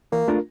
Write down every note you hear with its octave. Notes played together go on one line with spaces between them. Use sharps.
E3 A#3
A3 D4 F4 A#4